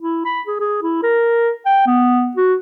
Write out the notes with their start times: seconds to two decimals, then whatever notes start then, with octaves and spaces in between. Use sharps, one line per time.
0.01 E4
0.25 B5
0.47 G#4
0.60 G#4
0.83 E4
1.03 A#4
1.66 G5
1.87 B3
2.37 F#4